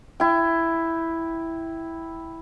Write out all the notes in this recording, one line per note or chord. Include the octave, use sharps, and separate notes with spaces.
E4 G5